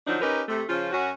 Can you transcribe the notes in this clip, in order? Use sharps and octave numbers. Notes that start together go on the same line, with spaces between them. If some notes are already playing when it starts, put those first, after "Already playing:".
D3 F3 F#3 D4 D#4
C#4 D#4 G4 A#4 B4
C3 A3
C#3 F3 C#4 F4
F#2 C#4 F#4